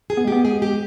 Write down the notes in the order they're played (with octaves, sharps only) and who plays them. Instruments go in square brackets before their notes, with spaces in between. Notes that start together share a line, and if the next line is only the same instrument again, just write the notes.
[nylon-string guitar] G#4
[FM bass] B3
G#3
[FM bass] B3 [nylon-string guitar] G4
[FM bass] G#3 [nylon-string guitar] G#4
[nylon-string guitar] G4